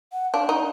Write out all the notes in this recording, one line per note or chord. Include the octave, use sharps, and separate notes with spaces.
F#5
D4 F5
D#4